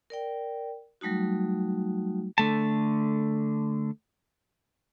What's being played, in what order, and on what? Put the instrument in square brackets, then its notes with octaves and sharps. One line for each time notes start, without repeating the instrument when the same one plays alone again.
[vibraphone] A#4 D5 G5
F#3 G3 A3 D#4 F#4
[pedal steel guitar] D3 A3 A5